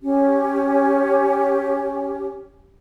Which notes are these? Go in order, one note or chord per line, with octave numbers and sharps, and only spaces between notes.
C#4 G4